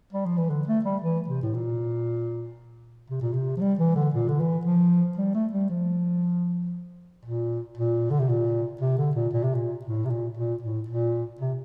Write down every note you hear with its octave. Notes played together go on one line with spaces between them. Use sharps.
G3
F3
E3
D3
A3
G3
E3
C3
A2
A#2
C3
A#2
C3
F3
G3
E3
D3
A#2
D3
E3
F3
G3
A3
G3
F3
A#2
A#2
D3
C3
A#2
C3
D3
A#2
A#2
C3
A#2
A2
C3
A#2
A#2
A2
A#2
C3